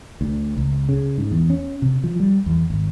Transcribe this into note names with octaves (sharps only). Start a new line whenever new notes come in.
D2
C#2
C#3
G#2
E2
C#4
C3
F3
G3
E2
G#1